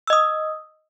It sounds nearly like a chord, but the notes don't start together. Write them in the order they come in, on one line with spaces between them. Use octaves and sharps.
E6 D#5 D#6